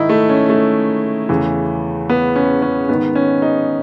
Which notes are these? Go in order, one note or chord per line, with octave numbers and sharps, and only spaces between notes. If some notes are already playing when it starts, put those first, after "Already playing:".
Already playing: G#2 D#3 D#4 E4
A3
C#4
A3
E2 C#3 E3
B3
C#4
C#4
G#2 D#3 B3
C#4
D#4